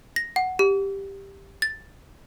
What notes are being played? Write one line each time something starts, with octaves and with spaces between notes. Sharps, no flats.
A#6
F#5
G4
A6